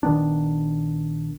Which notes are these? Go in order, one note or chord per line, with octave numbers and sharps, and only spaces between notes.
A#1 D#3 B3 D4